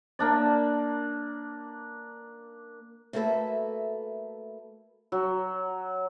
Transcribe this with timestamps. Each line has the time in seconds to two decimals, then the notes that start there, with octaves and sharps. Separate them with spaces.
0.19 A#3 D4 D5
3.13 A3 A#3 F#4 A4 B4 E5
5.12 F#3